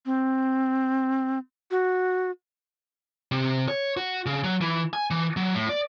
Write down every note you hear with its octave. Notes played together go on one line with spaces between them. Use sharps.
C4
F#4
C3
C#5
F#4
C#3
F#3
E3
G#5
E3
F#3
A2
D5